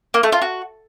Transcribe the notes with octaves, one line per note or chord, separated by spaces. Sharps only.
A#3
A3
F4
F#4